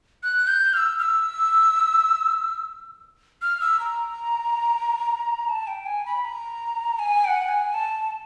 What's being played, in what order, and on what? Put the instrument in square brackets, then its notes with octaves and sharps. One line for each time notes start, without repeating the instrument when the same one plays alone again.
[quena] F#6
G6
F6
E6
F6
E6
F6
E6
A#5
A5
G5
G#5
B5
A#5
G#5
G5
F#5
G#5
A5